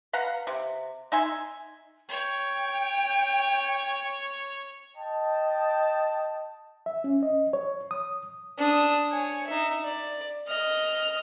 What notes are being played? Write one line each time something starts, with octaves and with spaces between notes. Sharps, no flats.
B4 F5 F#5 A#5
C3
D#4 E5 G#5 C6
C#5 G5
D#5 G5 A5
E5
C#4
D#5
C#5
D#6
D4 D#6
C#5 G#5
D#4 E5
D5
D#5 F6